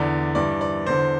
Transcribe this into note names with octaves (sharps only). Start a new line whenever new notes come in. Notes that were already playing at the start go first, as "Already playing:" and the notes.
Already playing: E2 D3 D5
G2 E3 D5
D5
E2 D3 C5